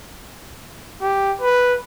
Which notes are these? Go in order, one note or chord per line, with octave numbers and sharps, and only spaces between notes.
G4
B4